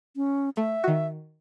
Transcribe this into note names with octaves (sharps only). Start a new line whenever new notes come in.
C#4
A3 E5
D#3 F#4